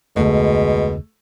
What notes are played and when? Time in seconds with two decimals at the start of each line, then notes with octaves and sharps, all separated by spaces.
0.16 F1 D2 B2 D3 G#3 A3